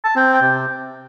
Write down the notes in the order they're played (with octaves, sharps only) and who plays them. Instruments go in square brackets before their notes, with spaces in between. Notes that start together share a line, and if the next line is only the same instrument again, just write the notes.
[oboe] A5
[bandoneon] C4 [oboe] G5
[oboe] G5
[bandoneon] C3